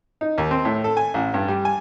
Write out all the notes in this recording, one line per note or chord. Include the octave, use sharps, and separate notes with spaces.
D#4
D#2
C4
A2
A4
G#5
A1
G2
G3
G#5